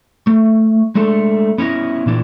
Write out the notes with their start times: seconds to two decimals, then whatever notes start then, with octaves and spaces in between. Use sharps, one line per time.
0.27 A3
0.95 G#3 A3 D4 A4
1.58 B3 C#4 E4 D#5
2.06 A#2 E3 D4